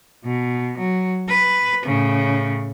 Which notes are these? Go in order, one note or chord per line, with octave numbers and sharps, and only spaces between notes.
B2
F#3
B4
A2 C#3